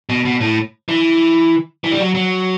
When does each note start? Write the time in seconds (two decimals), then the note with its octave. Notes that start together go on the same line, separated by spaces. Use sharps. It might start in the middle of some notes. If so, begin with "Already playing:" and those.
0.09 B2
0.25 B2
0.41 A2
0.89 E3
1.84 E3
1.91 G3
2.00 F#3
2.15 F#3